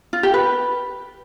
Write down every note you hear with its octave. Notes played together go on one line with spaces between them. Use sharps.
F4
G4
B4